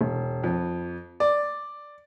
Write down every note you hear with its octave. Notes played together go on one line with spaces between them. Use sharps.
E1
F2
D5